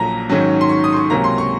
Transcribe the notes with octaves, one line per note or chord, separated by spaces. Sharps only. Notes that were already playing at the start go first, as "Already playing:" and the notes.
Already playing: A#1 A#2 F#3 A#3 A#5
G#2 D#3 F#3 C#4
C6
C#6
D#6
C6
C#6
C#2 C3 F#3 A#3 A#5
C6
C#6